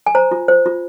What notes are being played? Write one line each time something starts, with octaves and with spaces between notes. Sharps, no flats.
G#5
C5 A#5
F4
C5
F4